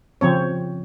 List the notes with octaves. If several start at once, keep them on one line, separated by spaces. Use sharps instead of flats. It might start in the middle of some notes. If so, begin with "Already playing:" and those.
C#3 F3 C4 C#5